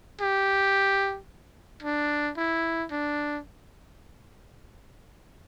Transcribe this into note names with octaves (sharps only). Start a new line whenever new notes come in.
G4
D4
E4
D4